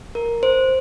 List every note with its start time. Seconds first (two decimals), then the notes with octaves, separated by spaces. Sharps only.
0.15 A#4
0.43 C5